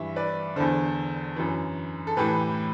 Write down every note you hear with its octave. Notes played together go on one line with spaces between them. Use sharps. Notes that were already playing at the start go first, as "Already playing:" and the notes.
Already playing: G2 E3 E5
B4 D5
E2 D3 A4 C5
F#2 E3
A4
A2 E3 G4 B4